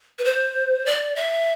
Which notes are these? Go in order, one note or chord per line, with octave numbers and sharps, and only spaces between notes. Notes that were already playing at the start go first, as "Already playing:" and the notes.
B4
C5
D5
E5